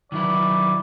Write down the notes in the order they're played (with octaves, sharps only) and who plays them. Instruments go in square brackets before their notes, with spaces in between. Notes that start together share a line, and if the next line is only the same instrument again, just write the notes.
[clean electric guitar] D#3 F#3 E4 [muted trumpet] D5